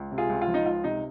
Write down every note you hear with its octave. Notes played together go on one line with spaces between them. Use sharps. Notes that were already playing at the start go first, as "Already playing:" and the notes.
Already playing: C#2
C3
F4 G#4
C#2
F4
F3
D#4
C#2 F4
C3 D#4